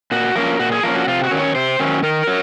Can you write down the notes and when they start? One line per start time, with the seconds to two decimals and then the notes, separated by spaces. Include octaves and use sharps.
0.11 A#2 F#4
0.36 F3 A#3 C#4 A#4
0.59 A#2 F#4
0.72 G#4
0.83 F3 A#3 C#4 A#4
0.95 F#4
1.08 C3 F4
1.24 F#4
1.31 D#3 F#3 C#4
1.39 C#5
1.55 C3 C5
1.80 D#3 F#3 C#4
2.03 D#3 A#4
2.27 F#3